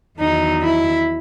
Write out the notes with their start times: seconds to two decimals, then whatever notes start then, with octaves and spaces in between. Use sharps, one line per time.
0.19 E2 D#3 F#3 D#4
0.62 E4